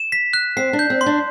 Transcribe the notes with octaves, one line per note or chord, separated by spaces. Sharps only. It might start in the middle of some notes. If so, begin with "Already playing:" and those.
Already playing: E7
B6
F#6
C4 C7
D4
G6
C4
C6
D4